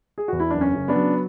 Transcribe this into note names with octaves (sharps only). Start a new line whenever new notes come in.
G#4
E2 F#4
E4
F#1 D4
C#4
C#3
B3 D4
F#3